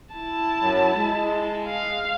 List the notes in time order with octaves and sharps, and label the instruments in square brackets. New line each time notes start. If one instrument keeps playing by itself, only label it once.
[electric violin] E4 A5
[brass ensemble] F#2 F#3
G#3
[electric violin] F5